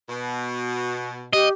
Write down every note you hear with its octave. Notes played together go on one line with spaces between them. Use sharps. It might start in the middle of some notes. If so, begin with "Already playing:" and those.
B2
G4 D#5